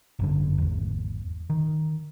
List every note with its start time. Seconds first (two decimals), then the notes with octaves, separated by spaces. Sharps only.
0.19 G1 F#2 D3
0.58 G#1 E2
1.50 D#3